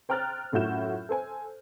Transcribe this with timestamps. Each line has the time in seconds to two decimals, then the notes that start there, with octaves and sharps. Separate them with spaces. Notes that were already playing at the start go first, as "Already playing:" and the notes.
0.09 C5 G5 A#5 F6 F#6 A6
0.52 F#2 A2 F4 F#4 G6 E7
1.09 A4 C5 G#5